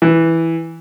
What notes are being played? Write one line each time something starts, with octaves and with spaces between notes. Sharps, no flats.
E3